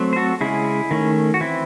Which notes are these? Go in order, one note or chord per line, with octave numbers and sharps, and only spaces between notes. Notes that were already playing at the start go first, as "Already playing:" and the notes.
Already playing: F#3 A3 C4
C5
F#4 A4
C#3 G#3 C#4 E4 G#4
D#3 A3 C#4
F#4
E3 C4 E4